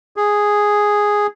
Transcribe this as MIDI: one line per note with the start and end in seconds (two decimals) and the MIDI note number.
0.17 1.27 68